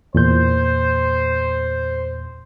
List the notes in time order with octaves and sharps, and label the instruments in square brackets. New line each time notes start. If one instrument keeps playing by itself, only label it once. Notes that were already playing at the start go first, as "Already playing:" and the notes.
[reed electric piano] E2 A#2 G6 [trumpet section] C5